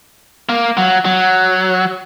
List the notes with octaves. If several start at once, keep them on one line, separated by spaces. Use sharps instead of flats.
A#3
F#3
F#3